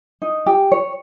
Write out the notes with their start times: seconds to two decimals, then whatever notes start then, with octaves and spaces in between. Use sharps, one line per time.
0.22 D#4
0.46 G4
0.72 C#5